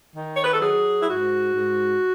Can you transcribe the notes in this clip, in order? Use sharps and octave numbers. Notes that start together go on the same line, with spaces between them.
D#3
C#5
B4
A4
F#3 G#4
E4
G#2 F#4
G#2